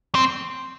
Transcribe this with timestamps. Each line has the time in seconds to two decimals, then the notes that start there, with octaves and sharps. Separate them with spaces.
0.15 C4